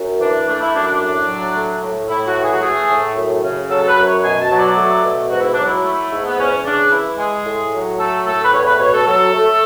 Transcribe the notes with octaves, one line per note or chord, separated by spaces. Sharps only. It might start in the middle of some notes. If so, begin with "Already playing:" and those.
Already playing: F#2
E3 D4
A3 D4
E4
F#2 D4
D4
A2
F#3
A3
A2
A2 E4
F#4
E3
G#4
F#4
A3 G#4
A2
F#2
C#3
F#3 A4
A4
B4
F#2
C#5
B2 G#5
A5
F#3
D5
A3
B2
G#2 F#4
E4
F#3 D4
E4
A3
G#2
B3
E2 C#4
C#3 D4
E3 E4
G#3 G#4
A2
F#3
A3 A4
A2 A4
B4
E2 C#5
B4
B2 C#5
A4
F#3 A4
A3